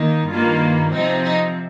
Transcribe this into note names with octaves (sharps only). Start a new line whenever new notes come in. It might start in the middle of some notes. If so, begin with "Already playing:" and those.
Already playing: D#3 A#3 D#4
G2 D#3 A#3 F4
C3 F3 C4 D#4
D#4